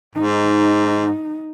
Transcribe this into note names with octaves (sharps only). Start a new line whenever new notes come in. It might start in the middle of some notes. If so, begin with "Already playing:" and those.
G#2 D#4